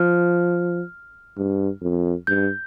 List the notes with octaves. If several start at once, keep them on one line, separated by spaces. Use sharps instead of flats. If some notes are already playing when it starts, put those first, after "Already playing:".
Already playing: F3 F6
G2
F2
G2 G6